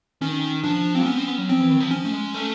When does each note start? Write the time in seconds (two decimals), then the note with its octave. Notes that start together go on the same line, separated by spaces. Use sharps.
0.22 D#3 C#4
0.64 F3 D4
0.95 C4
1.06 B3 C#4
1.17 C4
1.27 B3
1.38 F#3
1.49 F3 C4
1.60 E3
1.70 D#3
1.80 F3
1.91 C#4
2.05 A3
2.12 G#3
2.34 A3